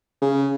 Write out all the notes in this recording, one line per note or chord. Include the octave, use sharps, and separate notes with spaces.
C#3